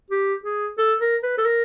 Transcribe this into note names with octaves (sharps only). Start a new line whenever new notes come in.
G4
G#4
A4
A#4
B4
A4
A#4